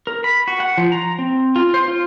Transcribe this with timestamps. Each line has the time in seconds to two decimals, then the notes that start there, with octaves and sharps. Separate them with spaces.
0.07 A#4
0.24 B5
0.47 F#4
0.60 F#5
0.78 F3
0.92 A#5
1.19 C4
1.56 F4
1.74 C5
1.88 F4